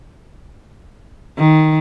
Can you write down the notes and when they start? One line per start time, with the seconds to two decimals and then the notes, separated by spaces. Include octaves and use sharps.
1.39 D#3